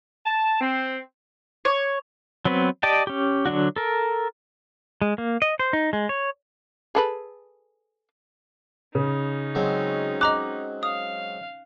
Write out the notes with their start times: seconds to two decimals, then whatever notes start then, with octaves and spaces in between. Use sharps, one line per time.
0.24 A5
0.60 C4
1.65 C#5
2.45 F#3 B3 C4 B4
2.83 G4 D5 D#5 G5 A5
3.07 C#4 G4
3.46 D3 F#3 D4 F#4
3.76 A4 A#4
5.02 G#3
5.18 A#3
5.42 D#5
5.59 C5
5.73 D#4
5.93 G#3
6.09 C#5
6.95 G#4 A4 B4
8.95 C#3 C#4 D#4
9.55 F#3 G#3 C4
10.21 D#5 A#5 D6 F#6
10.83 F5 D#6